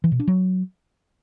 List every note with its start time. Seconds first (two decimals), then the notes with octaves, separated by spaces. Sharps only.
0.04 E3
0.12 B2
0.20 D4
0.28 F#3